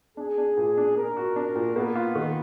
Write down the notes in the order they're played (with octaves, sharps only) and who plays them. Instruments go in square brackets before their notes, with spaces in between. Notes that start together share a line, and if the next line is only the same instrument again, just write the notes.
[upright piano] D4 [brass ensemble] G#4
[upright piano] D4
A#2
D4
[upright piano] D4 [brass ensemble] A#4
[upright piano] F#4
D4
A#2
[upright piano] A#3 [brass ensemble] B3
[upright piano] F4
D#3